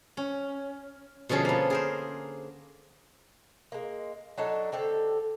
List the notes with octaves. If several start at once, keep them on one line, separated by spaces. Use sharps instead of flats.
C#4
B2 D3 F3 C#4 G#4
A#3 B3
G#4 A#4 C5
G#3 A#3
F#3 D4 D#4 A4
D3 C4 G4 A4